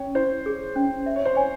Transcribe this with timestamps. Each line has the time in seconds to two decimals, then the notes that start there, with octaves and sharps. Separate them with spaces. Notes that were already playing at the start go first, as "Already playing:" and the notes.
Already playing: C#4 C#5
0.15 E4 C5
0.46 G#4
0.76 C#4
1.06 E5
1.16 C#5
1.25 C5
1.35 C#5 G#5